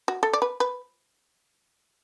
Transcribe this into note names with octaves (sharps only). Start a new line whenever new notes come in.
F#4
A4
D5
B4
B4